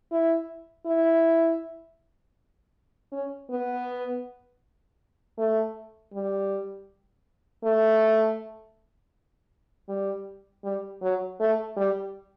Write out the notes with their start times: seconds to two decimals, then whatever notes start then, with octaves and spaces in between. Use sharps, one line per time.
0.12 E4
0.86 E4
3.12 C#4
3.50 B3
5.38 A3
6.13 G3
7.64 A3
9.88 G3
10.64 G3
11.02 F#3
11.40 A3
11.76 G3